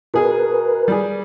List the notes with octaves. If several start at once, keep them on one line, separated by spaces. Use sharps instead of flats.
B2 G#4 A#4 B4
G3 G#4